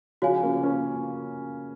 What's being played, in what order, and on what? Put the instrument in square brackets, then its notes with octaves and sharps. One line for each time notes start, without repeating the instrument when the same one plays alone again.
[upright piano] C#3 F3 [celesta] F#4 C#5 F5 G#5
[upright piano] A#3 C#4
A#3 C#4